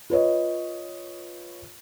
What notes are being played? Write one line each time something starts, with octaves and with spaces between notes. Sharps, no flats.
F4 B4 C#5 D#5